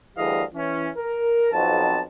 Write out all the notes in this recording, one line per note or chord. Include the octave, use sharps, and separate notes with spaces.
D2 E3 G3 G#4 D#5 F5
E3 C#4
A#4
B1 F2 A5